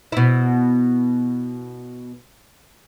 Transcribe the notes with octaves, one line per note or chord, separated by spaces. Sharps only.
B2 E4